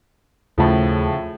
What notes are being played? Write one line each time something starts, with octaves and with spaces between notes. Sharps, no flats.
D#2 A2 C#3 F3 A3